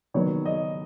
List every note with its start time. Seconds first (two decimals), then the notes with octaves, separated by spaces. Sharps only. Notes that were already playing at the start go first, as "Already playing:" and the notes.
0.14 D#3 F#3 B3 C#5
0.45 D#5